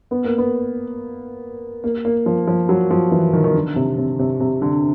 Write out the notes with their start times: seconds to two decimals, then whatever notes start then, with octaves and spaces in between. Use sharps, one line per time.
0.11 B3
0.25 A#3
0.38 B3
1.84 A#3
2.05 A#3
2.26 F3
2.47 F3
2.69 F#3
2.91 F3
3.12 E3
3.33 D#3
3.44 D#3
3.54 D3
3.76 C3
3.98 C3
4.19 C3
4.40 C3
4.62 D3